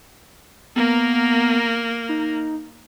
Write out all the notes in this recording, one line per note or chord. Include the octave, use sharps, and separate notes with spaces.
A#3 B3 A#4
D#4